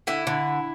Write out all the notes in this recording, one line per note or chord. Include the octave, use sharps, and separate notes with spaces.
D3 E4
D3